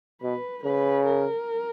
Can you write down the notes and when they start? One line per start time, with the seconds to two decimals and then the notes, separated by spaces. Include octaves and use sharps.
0.22 B2 B4
0.64 C#3 B4
1.06 A#4